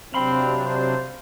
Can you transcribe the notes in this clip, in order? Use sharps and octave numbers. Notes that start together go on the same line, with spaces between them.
C3 F#3 C4 D4 F5 B5 C6
C5